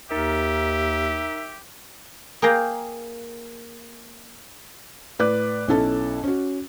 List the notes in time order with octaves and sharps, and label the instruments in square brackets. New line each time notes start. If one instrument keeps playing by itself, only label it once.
[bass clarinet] D#2 [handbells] D#4 A#4 [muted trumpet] G4 [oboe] E5
[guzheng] A#3 G#4 F5 G5 A#5
[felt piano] A2 B4 D5 D6 F#6
B1 C#4 E4 A4 A5
C#4 F#4